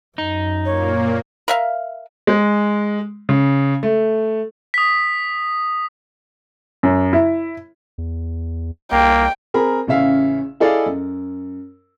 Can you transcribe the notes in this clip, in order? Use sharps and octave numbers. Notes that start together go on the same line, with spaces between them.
F#2 D#4
A#2 A#3 C#5
A#4 E5 F5
G#3
C#3
A3
D#6 B6
F#2
E4
E2
C2 A#3 G5
C4 G#4 A#4 A#5 B5
A1 C#3 C#4 E5 F5
E4 G#4 A4 D5 D#5 F5
F#2